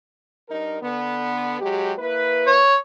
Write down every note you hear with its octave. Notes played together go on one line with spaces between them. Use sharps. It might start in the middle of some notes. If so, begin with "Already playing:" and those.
G2 D#4 A#4
D3 B3
F#3 G#3 G4
A#3 E4 B4
C#5